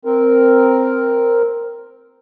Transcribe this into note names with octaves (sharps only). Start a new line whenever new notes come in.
C4 A#4